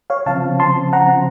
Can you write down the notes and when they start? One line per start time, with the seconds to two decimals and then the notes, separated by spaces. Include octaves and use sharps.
0.10 C#5 F5
0.26 C#3 F3 C4 F5 A5
0.60 A5 C6
0.93 F#5 A#5